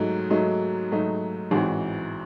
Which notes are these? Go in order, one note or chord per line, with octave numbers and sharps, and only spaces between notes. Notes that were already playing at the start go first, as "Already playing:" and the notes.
Already playing: G#2 F#3 A3 D#4
G#2 F#3 A3 D#4
G#2 F#3 A3 D#4
A1 G#2 E3 C4 F#4